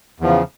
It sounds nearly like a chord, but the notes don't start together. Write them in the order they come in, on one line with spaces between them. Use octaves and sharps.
E2 F3 C#3